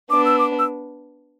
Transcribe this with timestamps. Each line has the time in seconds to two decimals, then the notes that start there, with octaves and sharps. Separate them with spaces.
0.10 B3 D4 D6
0.25 E6
0.39 D6
0.59 E6